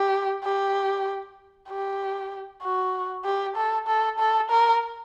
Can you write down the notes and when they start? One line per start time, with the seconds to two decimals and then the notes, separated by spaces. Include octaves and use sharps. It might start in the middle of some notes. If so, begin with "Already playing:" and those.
Already playing: G4
0.44 G4
1.69 G4
2.62 F#4
3.25 G4
3.56 A4
3.87 A4
4.19 A4
4.50 A#4